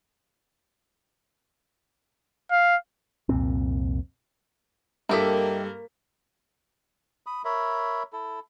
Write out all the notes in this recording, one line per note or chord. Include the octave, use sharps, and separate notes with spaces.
F5
C2 F2 A#2 C4
G2 A#3 E4 G4 A4 A#4 D#5 B6
B5 D#6
A#4 C#5 E5 B5
E4 A4